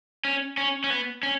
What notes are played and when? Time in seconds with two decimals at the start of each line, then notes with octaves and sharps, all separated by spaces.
0.25 C#4
0.57 C#4
0.84 C#4
0.90 B3
1.23 C#4